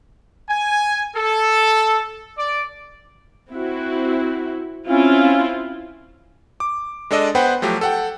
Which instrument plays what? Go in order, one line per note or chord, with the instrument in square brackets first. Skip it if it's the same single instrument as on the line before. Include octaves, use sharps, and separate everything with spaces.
[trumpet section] G#5
A4
D5
[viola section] C4 E4 F#4
[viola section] C4 E4 F4 [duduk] C#4
[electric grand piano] D6
G#3 D4 A4 D5 D#5
B3 B4 C5 F#5 G5
F3 F#3 A3 G4
A4 F#5 G5